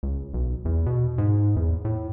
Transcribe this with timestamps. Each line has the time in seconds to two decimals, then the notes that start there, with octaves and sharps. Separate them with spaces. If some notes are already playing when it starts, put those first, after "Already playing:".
0.03 C#2
0.34 B1
0.65 E2
0.86 B2
1.18 G#2
1.56 E2
1.85 A2